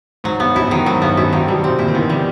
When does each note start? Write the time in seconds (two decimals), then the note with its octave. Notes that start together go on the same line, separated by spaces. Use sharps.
0.24 G#2 F#3
0.40 G2 B3
0.55 F#2 E4
0.71 G2 D#3
0.86 G#2 F#3
1.02 G2 B3
1.17 F#2 E4
1.33 G2 D#3
1.48 B2 G3
1.64 C3 C4
1.78 A#2 E4
1.88 D#3
1.95 B2 E3
2.10 D#3 G3